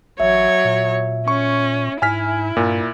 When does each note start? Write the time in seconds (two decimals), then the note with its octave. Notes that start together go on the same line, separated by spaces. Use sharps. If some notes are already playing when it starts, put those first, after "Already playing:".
0.20 A1 F#3 C#5 E5
0.65 A#2
1.28 C#4 C#6
2.02 G#2 E4 G#5 F6 B6
2.57 G2 A#2